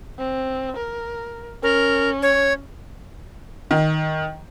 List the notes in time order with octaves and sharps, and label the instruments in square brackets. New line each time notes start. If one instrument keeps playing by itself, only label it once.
[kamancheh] C4
A#4
[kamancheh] C#4 [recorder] A#4
[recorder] C#5
[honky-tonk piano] D#3